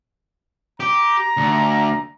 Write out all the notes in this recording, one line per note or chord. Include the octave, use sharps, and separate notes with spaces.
G4 A#5
D2